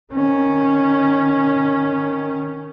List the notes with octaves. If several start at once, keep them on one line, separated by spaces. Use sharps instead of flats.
D#3 C#4